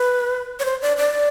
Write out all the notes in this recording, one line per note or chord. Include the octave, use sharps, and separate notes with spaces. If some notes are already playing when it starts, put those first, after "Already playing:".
Already playing: B4
C#5
C5
D5
D5